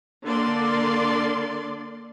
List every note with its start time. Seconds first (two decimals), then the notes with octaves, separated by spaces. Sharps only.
0.24 D3 A#3 D5 C6